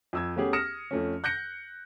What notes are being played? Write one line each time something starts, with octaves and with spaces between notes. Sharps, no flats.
F2 E6 G#6
A3 B3 C#4 G4 G#4
D#6 F6 A#6 C#7 E7
F2 A3 C#4
F#6 G6 A#6 C#7